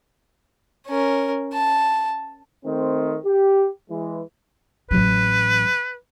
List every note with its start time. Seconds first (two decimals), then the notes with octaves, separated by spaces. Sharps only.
0.87 C#4 A#4
1.53 A5
2.65 D#3 A3 C4
3.25 G4
3.90 E3 G#3
4.91 A1 F#3 B4